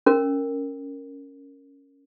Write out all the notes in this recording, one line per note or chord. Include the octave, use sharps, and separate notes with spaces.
C#4 A#4